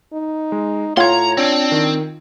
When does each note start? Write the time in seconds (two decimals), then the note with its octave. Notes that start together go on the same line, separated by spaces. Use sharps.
0.13 D#4
0.52 G#3
0.97 A2 F4 C#5 F#5 A#5 C6 G#6
1.38 C4 D4 C#5
1.72 D#3